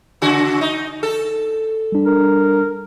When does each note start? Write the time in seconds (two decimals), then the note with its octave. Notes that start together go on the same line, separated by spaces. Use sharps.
0.22 C#3 F#4
0.61 D#4
1.03 A4
1.92 G3 D4
2.05 A#4